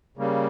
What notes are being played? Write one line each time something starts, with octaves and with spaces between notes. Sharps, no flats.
C#3 G3 A#3